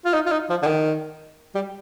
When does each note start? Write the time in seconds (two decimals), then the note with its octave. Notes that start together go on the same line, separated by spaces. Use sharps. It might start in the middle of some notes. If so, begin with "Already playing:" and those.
0.05 F4
0.14 D#4
0.26 F4
0.31 D#4
0.50 F3
0.62 D3
0.66 D#3
1.55 G3